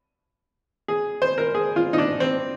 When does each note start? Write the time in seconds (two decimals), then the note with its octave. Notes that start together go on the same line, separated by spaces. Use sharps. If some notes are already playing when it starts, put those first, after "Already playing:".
0.88 G#4
1.22 C5
1.38 A#4
1.55 G#4
1.76 F4
1.93 D#4
1.98 D4
2.20 C4